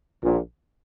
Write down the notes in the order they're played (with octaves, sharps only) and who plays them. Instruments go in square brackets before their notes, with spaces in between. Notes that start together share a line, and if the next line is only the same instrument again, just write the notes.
[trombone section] A#1 A#2